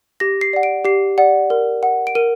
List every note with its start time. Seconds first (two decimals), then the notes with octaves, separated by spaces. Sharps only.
0.20 G4 A#6
0.41 C7
0.53 D5 F#5
0.63 D7
0.85 G4 C7
1.18 D5 F#5
1.50 A#4
1.83 F#5
2.07 D7
2.15 A#4 D#7